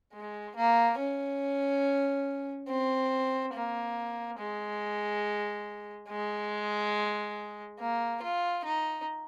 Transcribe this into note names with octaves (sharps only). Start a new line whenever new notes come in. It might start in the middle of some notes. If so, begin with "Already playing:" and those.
G#3
A#3
C#4
C4
A#3
G#3
G#3
A#3
F4
D#4